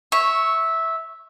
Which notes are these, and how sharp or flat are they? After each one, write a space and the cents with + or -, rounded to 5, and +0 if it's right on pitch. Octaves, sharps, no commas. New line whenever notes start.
C#5 -15 E5 -10 C#6 +0